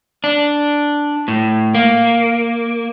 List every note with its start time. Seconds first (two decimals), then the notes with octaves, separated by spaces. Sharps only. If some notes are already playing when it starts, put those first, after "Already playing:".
0.24 D4
1.28 A2
1.74 A#3